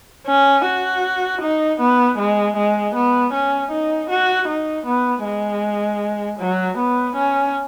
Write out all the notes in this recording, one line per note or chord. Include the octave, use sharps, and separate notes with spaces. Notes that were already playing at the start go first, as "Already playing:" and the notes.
C#4
F#4
D#4
B3
G#3
G#3
B3
C#4
D#4
F#4
D#4
B3
G#3
F#3
B3
C#4